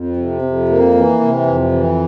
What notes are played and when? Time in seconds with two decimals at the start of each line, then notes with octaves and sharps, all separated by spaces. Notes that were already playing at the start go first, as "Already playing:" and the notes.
Already playing: F2
0.17 C3
0.42 F2
0.69 A#3
0.95 E3
1.20 C3
1.46 F2
1.72 E3